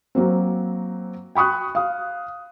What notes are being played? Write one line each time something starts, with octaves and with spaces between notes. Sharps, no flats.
F#3 A#3 C4
G5 B5 C#6 D#6 F#6
F5 D#6